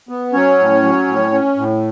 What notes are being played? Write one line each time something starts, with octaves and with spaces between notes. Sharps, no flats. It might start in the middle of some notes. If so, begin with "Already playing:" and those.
B3
F#3 C#4 C#5
A2
F#3
A2
C#4
A2